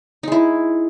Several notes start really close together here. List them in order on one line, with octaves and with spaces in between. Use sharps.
D#4 G#3 E4